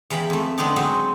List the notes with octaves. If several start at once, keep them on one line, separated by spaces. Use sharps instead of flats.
E2 E3 F5 G5 B5
F2 A3
D3 B3 C4 D4 D#4
F#3 G#3 C4 D#4 F#4